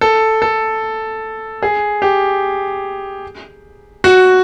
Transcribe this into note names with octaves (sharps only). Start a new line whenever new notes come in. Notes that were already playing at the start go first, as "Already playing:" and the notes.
A4
A4
G#4
G4
F#4